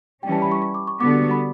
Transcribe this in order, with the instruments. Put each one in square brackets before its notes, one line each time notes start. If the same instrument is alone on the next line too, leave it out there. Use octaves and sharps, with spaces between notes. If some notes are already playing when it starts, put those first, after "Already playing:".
[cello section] E3 G3 C#4 [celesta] G5
[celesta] A5
B5
C#6
C#6
D6
C#6
[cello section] D3 G3 B3 F#4 [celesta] D6
[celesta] B5